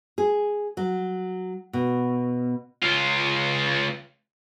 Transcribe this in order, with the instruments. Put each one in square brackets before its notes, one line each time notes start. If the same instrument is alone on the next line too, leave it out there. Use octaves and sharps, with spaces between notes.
[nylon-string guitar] G#4
F#3
B2
[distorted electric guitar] C#2 F4